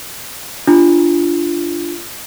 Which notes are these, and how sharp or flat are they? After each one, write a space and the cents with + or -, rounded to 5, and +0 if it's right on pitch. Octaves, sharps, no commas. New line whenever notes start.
D4 +0 F4 -20